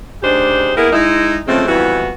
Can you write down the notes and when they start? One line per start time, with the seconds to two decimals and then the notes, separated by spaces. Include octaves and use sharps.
0.23 D2 C#3 D4 D#4 G4 C5
0.77 A#3 B3 E4 G#4 A#4
0.92 G#3 D#4 E4
1.47 C#3 F3 G#3 A3 C4
1.67 F2 E3 G3 B3 E4 F#4